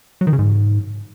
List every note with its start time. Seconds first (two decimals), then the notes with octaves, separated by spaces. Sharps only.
0.21 F#3
0.27 D#3
0.33 C#3
0.39 G#2